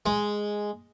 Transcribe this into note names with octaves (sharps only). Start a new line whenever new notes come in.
G#3